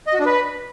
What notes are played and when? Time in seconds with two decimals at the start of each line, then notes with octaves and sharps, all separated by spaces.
0.07 D#5
0.14 F#4
0.20 D4
0.26 B4